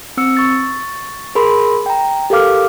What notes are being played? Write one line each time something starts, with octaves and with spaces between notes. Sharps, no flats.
C4 E6 C#7
C#6 A6
G#4 A#4 B5 C6
G5 A#5
G4 A4 A#4 F5 D6 F6